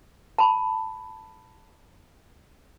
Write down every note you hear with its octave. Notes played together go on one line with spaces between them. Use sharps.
A5 B5